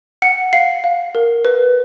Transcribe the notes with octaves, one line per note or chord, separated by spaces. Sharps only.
F#5 C#7
F5 C7
F5
A#4
B4